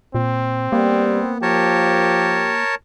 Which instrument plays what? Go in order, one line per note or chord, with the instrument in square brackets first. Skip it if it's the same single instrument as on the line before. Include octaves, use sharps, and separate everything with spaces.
[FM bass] A#2 [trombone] C4
[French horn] G3 [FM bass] A#3 [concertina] B3
[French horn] F3 [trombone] G4 [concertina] A#4 C#5 A5